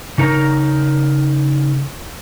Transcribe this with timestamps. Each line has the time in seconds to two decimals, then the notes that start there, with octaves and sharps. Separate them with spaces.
0.18 C#3 D#4 A#4 A#5